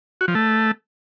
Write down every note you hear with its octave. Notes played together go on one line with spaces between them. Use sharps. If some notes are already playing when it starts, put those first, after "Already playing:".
F#4
F3
A3